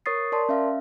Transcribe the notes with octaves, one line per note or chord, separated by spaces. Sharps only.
A#4 C#5 C#6 D#6 A6 C7
A#4 D5 A5 C6
C#4 E5 F5